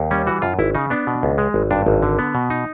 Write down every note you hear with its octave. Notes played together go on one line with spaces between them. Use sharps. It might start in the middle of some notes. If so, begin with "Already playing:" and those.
Already playing: D#2
G3 C#4
E3 F#4
F#2 F4
G#1 E4
C#3 D#4
B3 D4
B2
C#2
G#3
G#1
G2 D4
G#1
D3
B3
B2
D#4